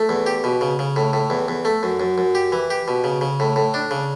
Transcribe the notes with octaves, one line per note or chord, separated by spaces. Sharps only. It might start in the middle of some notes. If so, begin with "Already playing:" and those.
Already playing: A3
E2
G4
B2
C#3
C#3
A2
A2
E2
E2
A3
F#2
F#2
F#2
G4
E3
G4
B2
C#3
C#3
A2
A2
D4
C#3